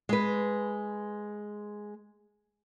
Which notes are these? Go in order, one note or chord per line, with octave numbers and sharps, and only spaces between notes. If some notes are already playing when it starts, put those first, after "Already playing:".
G#3 B4